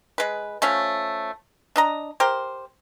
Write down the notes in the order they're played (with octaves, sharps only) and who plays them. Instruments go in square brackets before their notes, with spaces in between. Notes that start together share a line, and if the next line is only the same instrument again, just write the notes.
[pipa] G#3 B4
F3 A3 C#4 C#5
D4 D#5 A#5
G4 A#4 C5